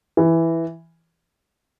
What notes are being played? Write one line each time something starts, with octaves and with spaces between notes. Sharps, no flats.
E3